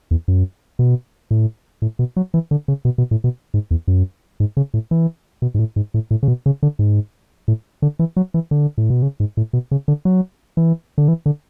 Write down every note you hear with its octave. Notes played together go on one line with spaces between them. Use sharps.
E2
F#2
B2
A2
A2
B2
F#3
E3
D3
C#3
B2
B2
A2
B2
G#2
E2
F#2
G#2
C#3
A2
E3
B2
G#2
A2
G#2
A2
A2
C#3
B2
C#3
D3
G#2
A2
D3
E3
F#3
E3
D3
A2
B2
C#3
G#2
A2
B2
C#3
D3
F#3
E3
D3
E3
D3